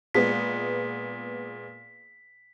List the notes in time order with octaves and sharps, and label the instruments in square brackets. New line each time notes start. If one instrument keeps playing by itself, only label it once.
[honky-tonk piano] A#2 G#3 B3 [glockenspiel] B6